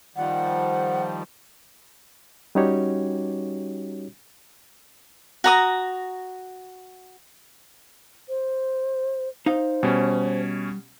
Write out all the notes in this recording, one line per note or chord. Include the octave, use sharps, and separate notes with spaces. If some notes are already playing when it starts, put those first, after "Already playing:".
D#3 F3 G3 F#5
G3 C#4 D#4 F#4 G4 C#5
F#4 A#5 D#6
C5
D#4 C5 F5
B2 G3 C#4